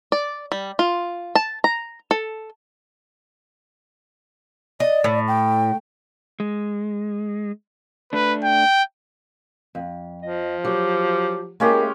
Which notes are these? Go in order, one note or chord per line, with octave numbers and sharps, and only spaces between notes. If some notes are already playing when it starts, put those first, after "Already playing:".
D5
G3
F4
A5
A#5
A4
D5 D#5
A2
G5
G#3
A3 D4 B4
G5
F2
F3 D#5
F#3 G4
G#3 A#3 C#4 E4 G4